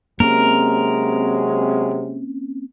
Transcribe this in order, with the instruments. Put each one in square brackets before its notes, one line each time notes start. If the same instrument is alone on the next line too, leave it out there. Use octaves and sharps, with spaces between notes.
[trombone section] C3 F#3 G#3 [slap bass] A#3 C4 C#4 [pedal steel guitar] A#4